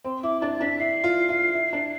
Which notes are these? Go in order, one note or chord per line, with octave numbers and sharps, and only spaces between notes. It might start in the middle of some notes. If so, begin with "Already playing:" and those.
C4 C6
E4 D6
D4 A6
D4 B6
E4 C7
F4
F4
E4
D4